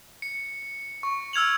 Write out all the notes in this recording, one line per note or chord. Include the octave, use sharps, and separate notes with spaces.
C#7
C#6
E6 F6 G#6 F7 F#7